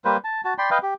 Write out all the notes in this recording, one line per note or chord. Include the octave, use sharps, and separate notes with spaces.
G3 A#3 B4 C5
A5
F#4 A5
D5 G5 B5 C6
B4 D#5 F5 G5
G4